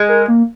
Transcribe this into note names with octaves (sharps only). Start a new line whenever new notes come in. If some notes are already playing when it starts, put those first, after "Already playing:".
Already playing: G#3
A#4
A#3